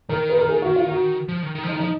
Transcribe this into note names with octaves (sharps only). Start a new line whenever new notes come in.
D#3 A#4
B4
A#4
G#4
F#4
F4
F#4
F3
D#3
D#3
F3
D#4
D#3
F3 D#4